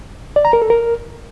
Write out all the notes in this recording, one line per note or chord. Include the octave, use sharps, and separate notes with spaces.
D5
A#5
A#4
A4
A#4